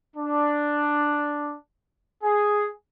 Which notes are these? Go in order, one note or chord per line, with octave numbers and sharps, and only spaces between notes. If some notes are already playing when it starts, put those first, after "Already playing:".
D4
G#4